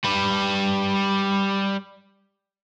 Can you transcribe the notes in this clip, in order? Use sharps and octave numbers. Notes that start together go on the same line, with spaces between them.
G3 B4